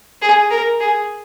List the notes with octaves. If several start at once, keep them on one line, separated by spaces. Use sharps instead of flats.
G#4
A#4
G#4